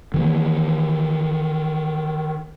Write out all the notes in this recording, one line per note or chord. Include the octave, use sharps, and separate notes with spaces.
D#3 E3 A#3